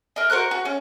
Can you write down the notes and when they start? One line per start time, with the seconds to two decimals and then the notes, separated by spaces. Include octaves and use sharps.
0.16 A#4 D#5
0.30 F#4 A#4 C5 F#6
0.51 F#4
0.65 C#4